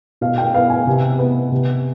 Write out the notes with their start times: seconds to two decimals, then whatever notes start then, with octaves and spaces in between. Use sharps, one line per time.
0.21 B2 F5
0.38 G5
0.54 B3 F5
0.70 G#5
0.87 C3
1.19 B3
1.52 C3